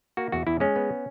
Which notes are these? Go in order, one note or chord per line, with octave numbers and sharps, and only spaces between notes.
A#3 F#4
E2 F#4
E2 E4
G#3 C#4
B3